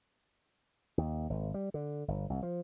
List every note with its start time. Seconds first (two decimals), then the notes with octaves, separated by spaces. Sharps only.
0.98 D#2
1.30 G#1
1.54 G3
1.74 D3
2.08 G1
2.30 C2
2.43 F3